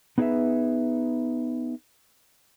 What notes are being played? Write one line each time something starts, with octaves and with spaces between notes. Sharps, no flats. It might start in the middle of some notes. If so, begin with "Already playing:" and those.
B3 D#4 G#4 A#4 B4 E5